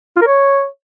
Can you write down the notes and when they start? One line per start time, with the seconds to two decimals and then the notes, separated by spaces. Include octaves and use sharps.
0.17 F4
0.22 A#4
0.27 C#5